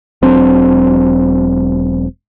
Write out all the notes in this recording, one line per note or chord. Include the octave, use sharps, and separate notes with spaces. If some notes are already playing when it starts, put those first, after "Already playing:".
E1 F#3 C4 D4